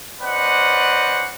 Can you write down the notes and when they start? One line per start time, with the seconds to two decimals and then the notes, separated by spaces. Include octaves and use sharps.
0.22 C#4 B4 C5 D5 D#5 F#5